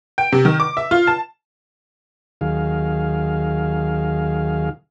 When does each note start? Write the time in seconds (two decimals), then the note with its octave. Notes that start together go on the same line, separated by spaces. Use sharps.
0.18 G5
0.32 C3
0.45 D#3
0.60 D6
0.77 E5
0.91 F4
1.07 A5
2.41 D#2 D#3 F#3 G#4 F5